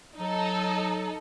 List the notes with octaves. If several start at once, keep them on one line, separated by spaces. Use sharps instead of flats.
F#3 D#4 A4